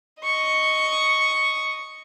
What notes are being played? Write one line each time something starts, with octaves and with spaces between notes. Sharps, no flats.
D#5 C#6